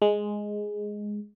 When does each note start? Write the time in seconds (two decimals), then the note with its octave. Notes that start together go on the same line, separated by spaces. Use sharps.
0.02 G#3